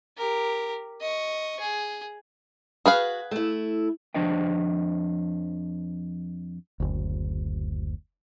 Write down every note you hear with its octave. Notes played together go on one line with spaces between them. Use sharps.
G4 A#4
D#5 C#6
G#4
F#4 G#4 B4 F5
A3 E4
F2 F3 D4 C5 D#5 G5
F#1 D2